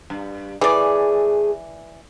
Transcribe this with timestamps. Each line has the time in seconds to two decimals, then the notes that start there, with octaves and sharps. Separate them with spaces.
0.10 G2
0.61 E3 A3 G#4 D5